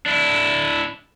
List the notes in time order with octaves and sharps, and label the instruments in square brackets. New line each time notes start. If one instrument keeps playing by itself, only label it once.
[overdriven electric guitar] D4 E4